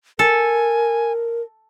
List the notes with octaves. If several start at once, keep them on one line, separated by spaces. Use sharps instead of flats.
A4 A#4 G#5